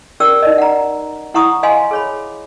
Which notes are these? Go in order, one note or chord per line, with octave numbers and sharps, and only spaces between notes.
C#4 G4 A#4 D5 E6
D#4 D5 D#5
F#5 A#5
E4 F#5 A#5 C#6 D#6
D#5 F5 G#5 C6
G#4 C#5 B5